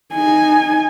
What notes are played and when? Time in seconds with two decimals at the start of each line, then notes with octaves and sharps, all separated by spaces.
0.14 D#4 G#5